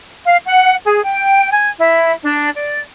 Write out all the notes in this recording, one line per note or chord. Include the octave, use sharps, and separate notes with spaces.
F5
F#5
G#4
G5
G#5
E4
D4
D5